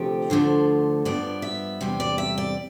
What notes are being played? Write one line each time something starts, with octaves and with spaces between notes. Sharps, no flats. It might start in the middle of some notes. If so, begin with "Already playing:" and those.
Already playing: D2 C3 F3 A3 G4
D2 D3 F3 A3 C5
G2 F3 B3 D5
E5
E2 C3 G3
D5
E5
D5